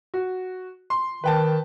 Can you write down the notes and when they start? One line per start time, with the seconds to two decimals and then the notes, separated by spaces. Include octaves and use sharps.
0.14 F#4
0.90 C6
1.24 D#3 B4 G5 A5